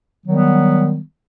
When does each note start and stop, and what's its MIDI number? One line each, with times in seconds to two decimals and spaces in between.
0.27 0.98 51
0.27 0.98 54
0.27 0.98 55
0.27 0.98 59